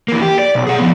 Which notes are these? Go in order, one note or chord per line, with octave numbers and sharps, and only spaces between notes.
E3 A#3
G4
D5
B1
G#4 F#5
F3 B3